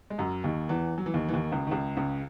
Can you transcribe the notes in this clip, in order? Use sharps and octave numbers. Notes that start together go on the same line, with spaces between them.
G#3
F#2 F#3
D#2 D#3
E2 E3
F#3
E3
D#2 D#3
E3
D#2 D#3
C#2 C#3
D#3
C#2 C#3
C#2 C#3